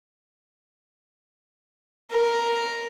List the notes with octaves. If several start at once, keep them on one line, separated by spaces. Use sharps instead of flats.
A#4